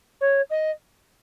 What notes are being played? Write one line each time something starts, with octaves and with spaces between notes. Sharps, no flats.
C#5
D#5